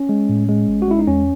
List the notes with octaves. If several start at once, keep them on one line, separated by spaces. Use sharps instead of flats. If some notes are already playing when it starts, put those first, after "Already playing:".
Already playing: C#4
G#3
A2
G#3
A1
F#4
G#3 E4
D#4
E2 C#4